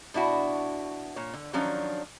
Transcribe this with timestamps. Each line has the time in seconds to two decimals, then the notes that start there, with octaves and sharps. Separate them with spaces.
0.14 B2 D4 E4 F#4
1.16 A#2 C#5
1.33 D3
1.53 D#3 F3 F#3 C#4 D4 F4